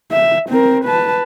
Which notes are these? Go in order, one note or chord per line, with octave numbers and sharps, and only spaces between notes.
E5
C4 A#4
B4 A5